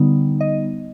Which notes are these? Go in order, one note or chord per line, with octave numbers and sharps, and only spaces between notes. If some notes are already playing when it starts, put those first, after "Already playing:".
Already playing: D3 G3 B3 D#4
D#5